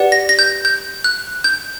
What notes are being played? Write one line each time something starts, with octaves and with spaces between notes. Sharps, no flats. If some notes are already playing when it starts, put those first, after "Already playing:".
Already playing: G4 B4 D5 F#5
A#6
A#6
G6
G6
F#6
G6